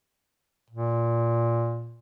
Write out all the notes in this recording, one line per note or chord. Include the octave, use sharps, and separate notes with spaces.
A#2